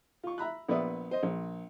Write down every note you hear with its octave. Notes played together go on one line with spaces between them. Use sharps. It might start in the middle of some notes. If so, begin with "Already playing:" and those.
F4 C#6
E5 A#5 B5 F#6
A#1 B3 B4 D5 E5 D#6
C5 D#5
A#1